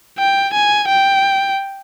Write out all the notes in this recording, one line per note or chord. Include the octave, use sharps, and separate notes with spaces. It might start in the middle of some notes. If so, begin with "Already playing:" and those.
G5
G#5
G5